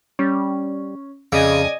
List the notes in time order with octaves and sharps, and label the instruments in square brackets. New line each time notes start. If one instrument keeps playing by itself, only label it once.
[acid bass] G3 [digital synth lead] C#4
[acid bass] F2 [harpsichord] C#3 [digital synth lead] D5 [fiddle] D#5 G#5